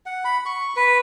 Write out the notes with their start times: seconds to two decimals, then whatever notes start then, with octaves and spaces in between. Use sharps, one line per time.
0.06 F#5
0.25 B5
0.46 C#6
0.76 B4